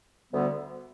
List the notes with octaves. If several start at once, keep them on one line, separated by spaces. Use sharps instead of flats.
D2 D3 G3 B3